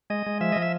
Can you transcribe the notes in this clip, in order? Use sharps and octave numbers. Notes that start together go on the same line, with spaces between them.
G#3 D#5
G#3
F3 E5
F3 D#5
E5